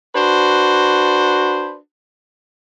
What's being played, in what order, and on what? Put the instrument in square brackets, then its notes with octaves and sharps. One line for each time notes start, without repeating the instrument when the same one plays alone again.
[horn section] D4 F#4 B4 C5